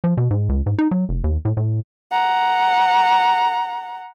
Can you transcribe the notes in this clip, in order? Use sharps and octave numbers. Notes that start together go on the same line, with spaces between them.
F3
B2
G#2
C#2
G#2
D#4
F#3
F1
D#2
A2
A2
F#5 A#5